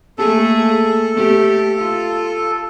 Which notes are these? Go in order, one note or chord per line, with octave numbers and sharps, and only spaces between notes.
A3 A#3 G#4 A4
A3 G4
F4